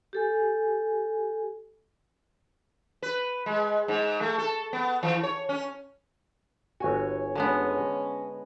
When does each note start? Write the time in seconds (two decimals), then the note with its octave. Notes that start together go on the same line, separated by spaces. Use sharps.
0.13 G4 A4 G#5
3.02 B4
3.46 G#3
3.88 G#2
4.21 A3
4.38 A4
4.73 B3
5.03 E3
5.23 C#5
5.49 C#4
6.80 G1 F#4 C#5 G#5
7.35 D3 G#3 B3 C#4 B4 D#5